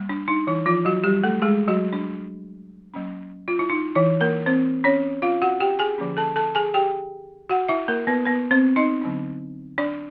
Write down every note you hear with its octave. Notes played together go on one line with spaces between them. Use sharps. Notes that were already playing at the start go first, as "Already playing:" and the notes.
Already playing: G3 A#3
D4
D#4
E3 E4
F3 F4
F#3 F#4
G3 G4
A3 A4
G#3 G#4
F#3 F#4
D4
F#3 A#3 C#4
F4
E4
D#4
E3 E4
A#3 A#4
C4 C5
C#4 C#5
F4 F5
F#4 F#5
G4 G5
G#4 G#5
D3 F3 A#3 C#4
A4 A5
A4 A5
G#4 G#5
G4 G5
F#4 F#5
E4 E5
A#3 A#4
B3 B4
B3 B4
C4 C5
D#4 D#5
D3 F#3 B3 D4
D4 D5